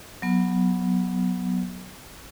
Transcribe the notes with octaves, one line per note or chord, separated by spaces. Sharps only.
F#3 B3